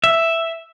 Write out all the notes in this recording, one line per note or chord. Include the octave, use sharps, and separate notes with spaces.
E5